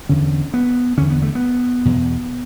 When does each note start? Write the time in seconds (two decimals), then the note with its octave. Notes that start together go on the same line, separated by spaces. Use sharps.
0.09 E2 D3 C#4
0.54 B3
0.97 E2 D3 C#4
1.10 B3
1.22 A3
1.35 B3
1.85 E2 B2